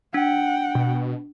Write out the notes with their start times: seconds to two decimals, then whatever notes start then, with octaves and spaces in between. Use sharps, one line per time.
0.14 D4 F#5 G5
0.75 B2